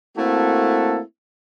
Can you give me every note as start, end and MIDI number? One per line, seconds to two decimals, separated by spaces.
0.17 1.01 57
0.17 1.01 58
0.17 1.01 60
0.17 1.01 64
0.17 1.01 66
0.17 1.01 69